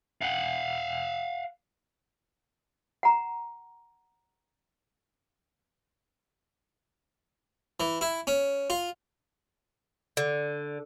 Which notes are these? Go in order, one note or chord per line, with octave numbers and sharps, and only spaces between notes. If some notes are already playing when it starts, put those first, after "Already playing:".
F5 F#5
F#5 A#5
E3
E4
C#4
F4
D3